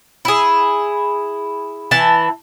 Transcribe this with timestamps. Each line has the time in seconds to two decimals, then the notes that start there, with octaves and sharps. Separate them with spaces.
0.25 E4 G#4
1.91 E3 E4 A5